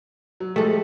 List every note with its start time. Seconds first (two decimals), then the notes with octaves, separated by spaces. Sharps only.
0.40 F#3
0.56 F3 G#3 A3 G4 A4